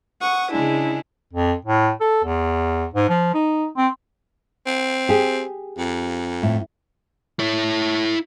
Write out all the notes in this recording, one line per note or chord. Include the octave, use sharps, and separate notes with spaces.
F#5 C#6 D#6
C#3 G#3 D4 E4
F2
A2
A4
E2
G#2
F3
D#4
C4
C4
G4 G#4
F2
A2
E4 C#5